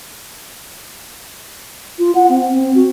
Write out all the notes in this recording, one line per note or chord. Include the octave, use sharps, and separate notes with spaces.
F4
F#5
C4
C4
F#4